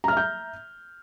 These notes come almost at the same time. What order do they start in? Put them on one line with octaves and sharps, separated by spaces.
A#5 F6 E5 G6